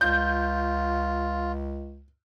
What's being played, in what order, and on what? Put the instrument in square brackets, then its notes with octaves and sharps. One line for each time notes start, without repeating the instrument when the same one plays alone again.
[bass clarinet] C#2 [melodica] F4 [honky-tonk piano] G6